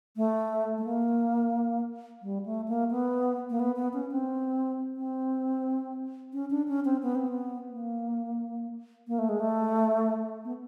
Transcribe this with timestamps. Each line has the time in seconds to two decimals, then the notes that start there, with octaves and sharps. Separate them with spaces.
0.17 A3
0.78 A3
0.85 A#3
2.22 G3
2.46 A3
2.68 A#3
2.91 B3
3.50 A#3
3.60 B3
3.76 B3
3.93 C#4
4.11 C4
4.97 C4
6.34 C#4
6.51 D4
6.68 C#4
6.85 C4
7.02 B3
7.15 C4
7.28 B3
7.71 A#3
9.08 A#3
9.19 A3
9.29 G#3
9.40 A3
10.45 B3